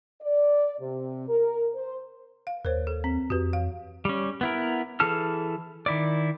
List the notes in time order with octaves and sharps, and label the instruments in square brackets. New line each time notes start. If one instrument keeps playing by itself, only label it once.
[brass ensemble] D5
C3
A#4
C5
[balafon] F5
[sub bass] D#2 [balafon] A#4 C5 C#5
[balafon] A4
C4
[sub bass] F2 [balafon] F#4 G4 B4
[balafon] E3 F5
[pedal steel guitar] G3 C#4
B3 E4 A#4
E3 G#4 A4 A5 F6
D#3 E4 D5